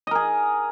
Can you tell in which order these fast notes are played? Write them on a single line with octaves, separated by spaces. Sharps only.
D#5 A#4 G#4